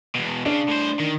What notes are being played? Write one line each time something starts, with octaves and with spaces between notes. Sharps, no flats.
E2 B2
C#3 D4
A2 C5
D#3